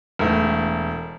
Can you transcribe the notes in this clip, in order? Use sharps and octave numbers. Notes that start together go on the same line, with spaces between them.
E1 A3